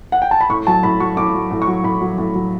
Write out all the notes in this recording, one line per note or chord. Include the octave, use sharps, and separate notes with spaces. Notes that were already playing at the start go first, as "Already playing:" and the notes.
F#5
G5
A5
B5
A2 C#6
F#3 A5
A2 B5
F#3 C#6
A2 D6
F#3
A2
C#6
F#3
A2 B5
F#3
A2
F#3